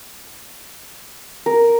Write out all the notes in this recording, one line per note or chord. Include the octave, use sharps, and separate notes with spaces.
A#4